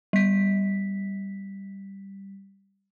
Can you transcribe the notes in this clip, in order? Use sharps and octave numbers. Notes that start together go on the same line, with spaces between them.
G3 B6